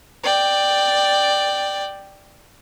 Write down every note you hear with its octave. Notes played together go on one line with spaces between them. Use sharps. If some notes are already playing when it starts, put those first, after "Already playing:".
D5 G5